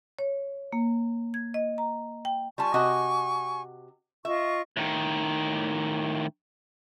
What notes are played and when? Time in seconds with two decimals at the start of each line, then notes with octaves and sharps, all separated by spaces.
0.19 C#5
0.73 A#3
1.34 G#6
1.54 D#5
1.78 A#5
2.25 G5
2.58 G3 F4 G#5 A5 C#6
2.74 C3 F#4 D#5
4.25 F4 D#5 E5 C#6
4.77 A2 D#3